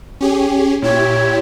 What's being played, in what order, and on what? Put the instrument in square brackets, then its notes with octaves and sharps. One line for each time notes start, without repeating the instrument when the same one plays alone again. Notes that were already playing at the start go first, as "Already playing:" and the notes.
[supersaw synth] C#4 G4 G#4
[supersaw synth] A#2 E4 G4 [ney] C#5